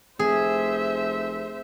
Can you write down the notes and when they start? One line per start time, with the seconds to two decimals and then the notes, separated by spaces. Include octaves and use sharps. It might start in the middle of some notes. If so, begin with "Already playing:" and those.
0.19 F1 G#4 C5 E5